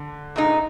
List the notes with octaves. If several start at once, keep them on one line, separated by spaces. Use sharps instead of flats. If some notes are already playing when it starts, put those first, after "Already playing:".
Already playing: D3
A#2 G#3 D#4